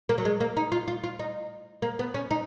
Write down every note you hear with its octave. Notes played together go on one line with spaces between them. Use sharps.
A#3
F#3
G#3
A#3
D#4
F4
F4
F4
D#4
A#3
B3
C#4
D#4